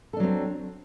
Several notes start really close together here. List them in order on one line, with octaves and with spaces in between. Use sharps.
A4 D4 F#3 C4